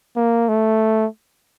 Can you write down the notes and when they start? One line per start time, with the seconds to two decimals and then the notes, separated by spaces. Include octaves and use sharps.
0.16 A#3
0.48 A3